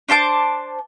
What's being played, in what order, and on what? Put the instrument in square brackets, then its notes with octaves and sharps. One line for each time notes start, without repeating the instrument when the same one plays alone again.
[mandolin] D4 C5 A5 D6